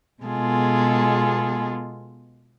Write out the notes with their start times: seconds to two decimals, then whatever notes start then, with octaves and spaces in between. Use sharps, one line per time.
0.24 B2 G#3 B3 F4 G#4 A4